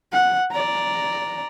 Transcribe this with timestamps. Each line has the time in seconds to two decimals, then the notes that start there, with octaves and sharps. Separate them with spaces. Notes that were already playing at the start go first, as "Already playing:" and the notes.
0.12 F#5
0.51 D5 A#5